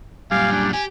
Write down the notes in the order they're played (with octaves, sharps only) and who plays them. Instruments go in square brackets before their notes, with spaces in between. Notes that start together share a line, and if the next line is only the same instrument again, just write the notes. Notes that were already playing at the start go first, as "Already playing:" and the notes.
[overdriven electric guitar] F#2 A#2 [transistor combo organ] G3 [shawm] F5 [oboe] G#5
[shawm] D4
[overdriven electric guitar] G4 [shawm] G#5